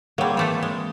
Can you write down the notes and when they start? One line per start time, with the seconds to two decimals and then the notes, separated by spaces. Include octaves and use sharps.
0.18 F#3 G3 A#3 C4 G#4
0.37 E3 A3 A4
0.63 G#3